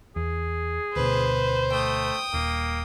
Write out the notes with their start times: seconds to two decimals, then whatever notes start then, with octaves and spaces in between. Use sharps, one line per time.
0.16 E2 G#4
0.96 D2 B2 B4 C5
1.72 A3 G5 D#6
2.34 D#1 A#3